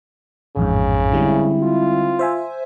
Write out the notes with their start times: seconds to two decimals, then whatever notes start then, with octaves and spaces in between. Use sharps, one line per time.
0.56 A1 F2 G#2 C#3
1.12 D3 G3 G#3 C4 E4
1.63 F4
2.19 C5 E5 G#5